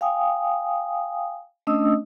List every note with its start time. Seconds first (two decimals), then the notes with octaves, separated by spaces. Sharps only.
0.01 F5 G5 G#5 D#6
1.67 A3 C#4 D4 D#5 D#6 E6